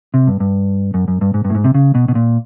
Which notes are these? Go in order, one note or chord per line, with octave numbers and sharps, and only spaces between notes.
C3
G2
G2
F#2
F#2
G2
G#2
G2
A2
G#2
C3
C#3
B2
B2
A#2